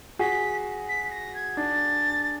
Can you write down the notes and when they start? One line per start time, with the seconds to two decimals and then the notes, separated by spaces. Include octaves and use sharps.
0.19 F#4 G#4 B6
0.88 B6
1.11 A#6
1.34 G#6
1.57 D4 A6